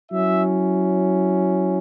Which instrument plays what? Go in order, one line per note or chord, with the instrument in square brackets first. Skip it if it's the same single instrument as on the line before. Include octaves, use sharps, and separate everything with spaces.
[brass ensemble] F#3 C#4 E4 E5